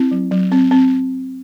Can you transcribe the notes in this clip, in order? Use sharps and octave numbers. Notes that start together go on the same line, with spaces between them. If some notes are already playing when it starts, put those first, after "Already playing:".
Already playing: C4 E4
F#3
F#3
C4
C4